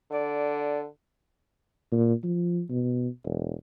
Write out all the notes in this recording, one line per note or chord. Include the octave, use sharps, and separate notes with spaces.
D3 D5
A#2
F3
B2
E1